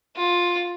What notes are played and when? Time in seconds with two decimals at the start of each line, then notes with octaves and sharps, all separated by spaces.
0.16 F4